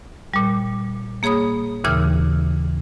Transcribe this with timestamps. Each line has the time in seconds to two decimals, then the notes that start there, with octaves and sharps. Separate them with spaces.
0.34 A#2 G3
1.23 A#3 G#4 C#5 B5 D#6
1.84 D#2 A#2 C#3 E3 E6 F6